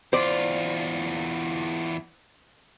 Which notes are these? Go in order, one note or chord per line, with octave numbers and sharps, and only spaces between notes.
E2 F4 C5 D5